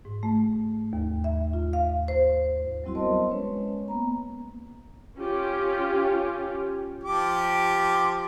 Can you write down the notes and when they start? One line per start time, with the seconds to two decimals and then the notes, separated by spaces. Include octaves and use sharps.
0.05 G#2
0.23 A3
0.93 D#2
1.24 E5
1.53 F4
1.73 F5
2.08 C5
2.84 F#3 G3 C4 E4 F#4 C6
2.95 B3 A#4 C5 D#5 A5 C6
3.30 G#3 C#4 B4 C#5
3.88 A#3 B3 A#5
5.17 C#4 F4 G4
7.03 F3 G4 D6